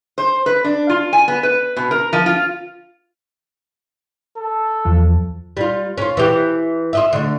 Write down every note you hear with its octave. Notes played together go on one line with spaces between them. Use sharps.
C5
B4
D4
F4
G#5
B3
B4
B2
A#4
F3
F4
A4
E2 F3
G3 F4
C#4 F4
E3 G4
F4 D#5 E5
D2 G#2 D3